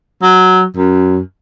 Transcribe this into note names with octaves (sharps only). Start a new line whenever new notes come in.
F#3
F#2